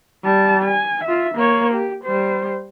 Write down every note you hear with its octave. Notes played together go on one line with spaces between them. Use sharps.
G3 A5
G#5
F4 E5
A#3 C#5
G4
G3 C5